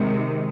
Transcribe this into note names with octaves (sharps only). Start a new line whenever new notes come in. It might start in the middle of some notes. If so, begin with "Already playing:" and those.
Already playing: C3 D#3 G#3